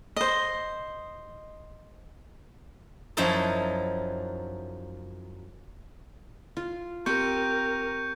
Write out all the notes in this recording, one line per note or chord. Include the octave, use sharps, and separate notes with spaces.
C5 D#5
F#2 F3 F#3 D#4 E4 A5
F4
C4 G4 A#4 G5 C#6 G6 C#7